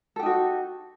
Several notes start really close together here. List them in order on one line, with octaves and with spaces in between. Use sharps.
A4 G4 D#4 F#4